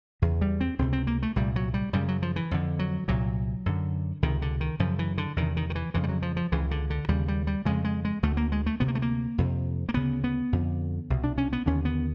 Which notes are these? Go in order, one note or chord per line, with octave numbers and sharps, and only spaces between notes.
E2 C#3
G3
C4
C#2 C3 C4
C4
A#3
A3
C2 A#2 G3
F#3
G3
F#2 C#3 G3
F#3
F3
E3
F2 D3
F#3
C2 A#2 F#3
F#2 D3
C#2 C3 D#3
D3
D#3
F#2 C#3 F3
E3
D3
E2 C3 D#3
D#3
D#3
E3
F2 C#3 E3
G3
F#3
F3
F3
C#2 C#3 E3
D3
D3
D#2 C#3 G3
G3
G3
F2 C#3 G#3
G#3
G#3
D2 D3 A3
A#3
G#3
A3
D2 C3 B3
A#3
A3
A#3
F2 C3
A#3
D2 C#3 B3
B3
F2 D3
C2 B2
D4
C#4
B3
D#2 D3 C#4
B3